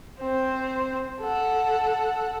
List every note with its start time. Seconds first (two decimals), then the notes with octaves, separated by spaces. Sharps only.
0.20 C4 C5
1.21 A4 F#5